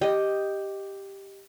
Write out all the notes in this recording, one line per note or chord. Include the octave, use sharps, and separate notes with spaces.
G4 D#5